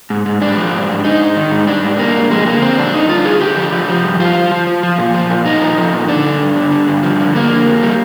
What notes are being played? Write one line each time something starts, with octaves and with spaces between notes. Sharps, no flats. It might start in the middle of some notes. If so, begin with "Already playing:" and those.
G#2
G#2
G#2 D4
F3
G#2
G#2
G#2 D#4
G#2
D#3
G#2
G3 D4
G#2
G3 A#3
G#2
F2 G#3
D3 A#3
D3 C4
F2 D4
D3 D#4
G3 F4
D3 G#4
D3 G4
F3
F3
F3
G2
F3 F4
F3
F3
F3
F3
A#2
F3
A#2
A#2 D#4
F3
F3
A#2
D3 D4
G2
G2
D3
D3
G2
F3
D3
F2 A#3
F2
F2
G3